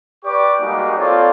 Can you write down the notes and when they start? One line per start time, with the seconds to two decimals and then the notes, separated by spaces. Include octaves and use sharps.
0.24 G4 B4 D5 C#6 D6
0.61 G3 G#3 A#3 D#4 F#4 G#5
0.98 C4 F4 A4 C#5 D5